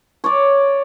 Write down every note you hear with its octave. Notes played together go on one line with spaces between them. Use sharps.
C#5 D5